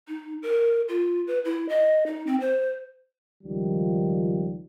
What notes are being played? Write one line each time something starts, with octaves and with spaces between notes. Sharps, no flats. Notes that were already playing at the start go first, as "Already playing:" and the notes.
D#4
A#4
F4
B4
E4
D#5
D#4
C4
C5
C#2 D#3 F3 G3